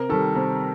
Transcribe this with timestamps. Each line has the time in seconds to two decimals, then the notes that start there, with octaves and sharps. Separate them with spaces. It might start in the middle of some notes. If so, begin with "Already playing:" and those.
Already playing: C3 A#4
0.09 D#3 G3 A4
0.35 C3